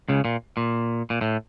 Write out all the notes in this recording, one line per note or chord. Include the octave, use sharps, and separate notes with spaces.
C#2 C#3
A#2
A#2
A#2
A2